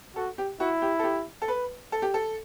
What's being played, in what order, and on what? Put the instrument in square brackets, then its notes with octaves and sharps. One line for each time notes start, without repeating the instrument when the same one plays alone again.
[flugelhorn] F#4 [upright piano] A4
[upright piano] G4
[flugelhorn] E4 [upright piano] F#4
[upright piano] G4
A4
G4
A4
B4
A4
G4
A4